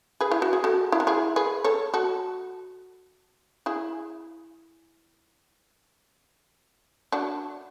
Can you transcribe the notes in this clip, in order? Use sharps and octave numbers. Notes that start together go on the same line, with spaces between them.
G#4 B4
E4
F#4
G#4
F#4 A4
E4
F#4
E4 G#4
G#4 B4
A4 C#5
F#4 A4
E4 G#4
D4 F#4